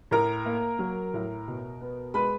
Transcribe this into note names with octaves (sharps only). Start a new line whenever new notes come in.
A2 A#4 A#5
A#3
F#3
A2
B2
B3
G#3 B4 B5